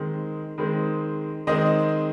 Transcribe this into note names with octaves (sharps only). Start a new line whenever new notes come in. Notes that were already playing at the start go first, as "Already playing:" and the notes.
Already playing: D#3 G#3 C4
D#3 G#3 C4
D#3 G#3 C4 D#5